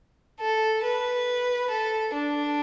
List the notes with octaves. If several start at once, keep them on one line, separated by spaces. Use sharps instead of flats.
A4
B4
A4
D4